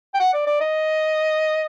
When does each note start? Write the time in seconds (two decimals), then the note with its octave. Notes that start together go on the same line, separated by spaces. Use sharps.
0.14 G5
0.20 F#5
0.33 D5
0.46 D5
0.60 D#5